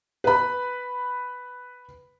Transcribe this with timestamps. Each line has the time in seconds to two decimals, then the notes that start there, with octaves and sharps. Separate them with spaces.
0.24 B4 B5